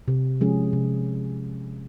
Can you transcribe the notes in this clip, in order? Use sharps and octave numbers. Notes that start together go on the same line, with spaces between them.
C3
F3 G#3 C#4 G#4
C3